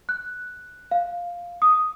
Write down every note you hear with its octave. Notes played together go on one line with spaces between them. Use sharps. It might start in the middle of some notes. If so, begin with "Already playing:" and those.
F#6
F5
D#6